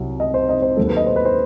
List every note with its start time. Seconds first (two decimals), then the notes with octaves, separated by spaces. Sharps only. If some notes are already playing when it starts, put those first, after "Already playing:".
Already playing: C2 C3 F#3
0.20 D#5
0.34 C5
0.49 D#5
0.62 C5
0.77 D#2 D#3 F#3 A4
0.87 B4
0.97 D#5
1.07 C5
1.16 B4
1.25 C5